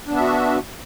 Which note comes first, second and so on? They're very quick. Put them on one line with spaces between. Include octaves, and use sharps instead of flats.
D4 B3 E5 F#4